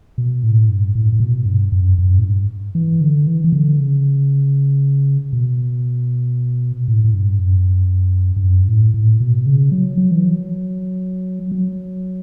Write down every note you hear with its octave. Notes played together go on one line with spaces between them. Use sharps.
B2
A2
G2
A2
A2
B2
G2
F#2
F#2
A2
G2
E3
D3
E3
E3
D3
C#3
B2
A2
A2
G2
F#2
G2
F#2
G2
A2
A2
B2
C#3
F#3
F#3
E3
F#3
F#3